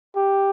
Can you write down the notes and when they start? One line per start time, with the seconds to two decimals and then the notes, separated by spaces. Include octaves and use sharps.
0.16 G4